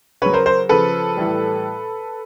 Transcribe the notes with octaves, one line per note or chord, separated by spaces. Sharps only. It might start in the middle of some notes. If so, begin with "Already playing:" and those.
C#3 F#3 B4 C#5
A#4 C5
A#4 C5
C#3 F3 A4 B4
A2 E3 G3